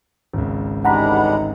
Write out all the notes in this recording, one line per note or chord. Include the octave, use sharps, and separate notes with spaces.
G#1 C#2
A1 G3 G#3 D4 D#4 F#5 A#5 B5